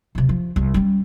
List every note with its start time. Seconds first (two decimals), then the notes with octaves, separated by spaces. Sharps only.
0.15 D1 C3
0.29 F3
0.56 C2
0.74 G3 C#4